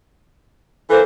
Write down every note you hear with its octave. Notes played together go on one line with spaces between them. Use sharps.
E3 A#3 A4 C5